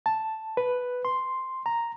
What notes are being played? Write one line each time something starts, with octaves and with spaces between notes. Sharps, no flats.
A5
B4
C6
A#5